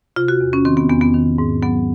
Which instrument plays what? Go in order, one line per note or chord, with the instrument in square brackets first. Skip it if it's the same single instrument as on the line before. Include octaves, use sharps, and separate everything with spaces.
[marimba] C3 F4
F#4
E2
C#4
D#3 C4
B3
E2 B3
B3
D#3
G#2
F#3 B3